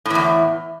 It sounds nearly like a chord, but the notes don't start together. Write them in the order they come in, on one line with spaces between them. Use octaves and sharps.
A2 E3 E2